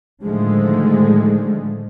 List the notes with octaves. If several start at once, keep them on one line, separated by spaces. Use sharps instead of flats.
A2 D3 D#3 F3 G#3 A3